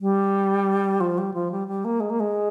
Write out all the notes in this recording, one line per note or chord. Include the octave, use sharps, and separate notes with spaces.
G3
F3
G3
F3
G3
G3
A#3
G#3
A#3
G#3